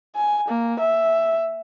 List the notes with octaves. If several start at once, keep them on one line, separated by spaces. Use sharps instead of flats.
G#5
A#3
E5